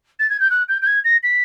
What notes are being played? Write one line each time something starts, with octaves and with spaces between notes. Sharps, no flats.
A6
G#6
G6
F#6
G6
G6
G#6
A#6
B6